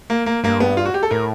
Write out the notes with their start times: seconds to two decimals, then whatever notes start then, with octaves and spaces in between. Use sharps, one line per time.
0.10 A#3
0.26 A#3
0.44 G2 A#3
0.60 B3
0.77 F4
0.86 F#4
0.94 G4
1.03 A4
1.11 A2 A#4